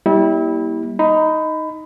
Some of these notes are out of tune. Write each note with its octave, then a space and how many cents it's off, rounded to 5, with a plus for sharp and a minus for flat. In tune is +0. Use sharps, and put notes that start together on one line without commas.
G3 +0 A#3 +35 E4 -30
D#4 +10 B5 +25